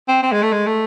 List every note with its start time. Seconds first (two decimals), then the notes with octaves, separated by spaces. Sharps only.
0.08 C4
0.23 C4
0.32 G#3
0.42 A3
0.52 G#3
0.66 A3